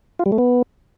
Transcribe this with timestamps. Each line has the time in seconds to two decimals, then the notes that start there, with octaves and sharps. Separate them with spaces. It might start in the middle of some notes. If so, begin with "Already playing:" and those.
0.19 F4
0.26 G3
0.32 A3
0.38 B3